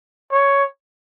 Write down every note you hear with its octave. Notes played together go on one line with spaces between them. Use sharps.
C#5